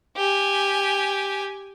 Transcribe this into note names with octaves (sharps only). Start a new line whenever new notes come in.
G4 G#5